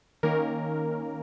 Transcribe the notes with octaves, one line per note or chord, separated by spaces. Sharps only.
D#3 A#3 C#4 A#4